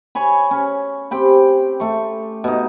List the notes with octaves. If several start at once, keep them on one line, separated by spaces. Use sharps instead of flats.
C#5 G#5 B5
C#4
C4 G4 G5 B5
A3 C#6
B2 D#4